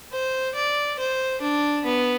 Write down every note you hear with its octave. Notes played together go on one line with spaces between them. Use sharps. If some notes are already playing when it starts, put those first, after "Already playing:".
C5
D5
C5
D4
B3